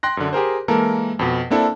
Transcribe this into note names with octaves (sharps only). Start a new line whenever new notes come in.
G5 C6 F#6 A#6
F#2 D3
G4 G#4 A#4 C5
E3 G#3 A#3 A4 A#4
F2 B2
A#3 C4 D4 E4 A4